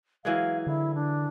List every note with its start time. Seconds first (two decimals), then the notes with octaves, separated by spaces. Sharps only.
0.25 E3 F#3 G#3 F5
0.67 D3 E4
0.95 D4